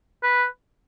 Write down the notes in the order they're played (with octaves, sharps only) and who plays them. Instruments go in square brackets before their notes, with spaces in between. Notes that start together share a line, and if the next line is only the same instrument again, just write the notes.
[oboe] B4